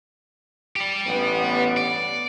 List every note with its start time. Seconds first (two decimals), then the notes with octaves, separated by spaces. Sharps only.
0.76 G4 D5
1.06 A1 G2 B3
1.77 D5